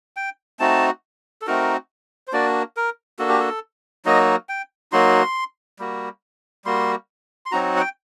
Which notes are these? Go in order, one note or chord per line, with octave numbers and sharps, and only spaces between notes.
G5
A3 C4 D#4 F#4 A5
A4
A3 C4 D#4 F#4 A#4
C5
A#3 D4 F#4 D5
A#4
A#3 D4 F#4 A4
G4
A4
F#3 A#3 D#4 F#4 D#5
G5
F#3 A#3 D#4 F#4 C6
G3 A#3 F#4
G3 A#3 F#4 C6
C6
F#3 C4 D#4 F#4 A#5
F#5
G5